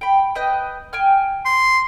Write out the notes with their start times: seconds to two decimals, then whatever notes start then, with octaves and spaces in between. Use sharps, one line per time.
0.01 G5 B5
0.35 B4 D#5 G5
0.93 G5 G#5 F6
1.45 C6